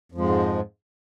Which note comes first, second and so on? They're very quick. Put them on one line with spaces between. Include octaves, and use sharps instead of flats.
F2 F3 G#3 G#2